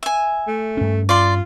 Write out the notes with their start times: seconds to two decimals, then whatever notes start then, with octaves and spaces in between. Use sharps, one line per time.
0.03 E5 G#5
0.48 A3
0.77 G2 C#4
1.09 F4 D5 C6